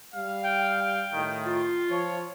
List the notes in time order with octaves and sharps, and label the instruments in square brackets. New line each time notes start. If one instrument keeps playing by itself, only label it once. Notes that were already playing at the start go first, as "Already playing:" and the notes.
[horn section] G3 F5
[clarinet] G5
G5
[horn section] A2 D#3
[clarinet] F4
[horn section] F3 C#5